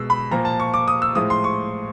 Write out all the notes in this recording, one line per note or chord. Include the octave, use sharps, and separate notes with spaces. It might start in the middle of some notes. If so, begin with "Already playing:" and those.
Already playing: B2 G#3 E6
B5
A#2 F3 A#3 A#5
A5
C#6
D6
D#6
E6
A2 F3 G#3 D#6
C6
C#6